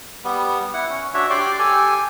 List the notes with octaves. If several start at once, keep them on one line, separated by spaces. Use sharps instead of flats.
G3 B3
E4 F#5
C#4
D4 F#4 C#5 E5
G4 D5 C6 D6
G4 A4 G#5